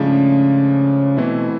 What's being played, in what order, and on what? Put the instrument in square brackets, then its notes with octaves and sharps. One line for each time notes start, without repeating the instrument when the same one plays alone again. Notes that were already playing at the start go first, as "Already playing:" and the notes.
Already playing: [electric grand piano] G#2 F3 A3 D4 [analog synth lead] C#3
[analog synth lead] B2 [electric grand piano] E3 A3 C4 E4